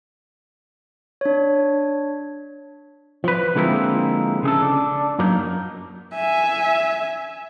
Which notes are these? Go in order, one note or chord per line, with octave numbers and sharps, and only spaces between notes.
D4 C#5
F3 B4
D3 F3 G#3 A#3 C4 E4
C#3 G#4 A4
D4
F#2 F#3 A#3 D#4
E5 G#5